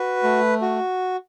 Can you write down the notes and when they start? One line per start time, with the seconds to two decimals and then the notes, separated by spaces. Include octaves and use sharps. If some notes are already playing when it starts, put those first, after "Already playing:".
Already playing: F#4 B4
0.24 A3
0.62 F#4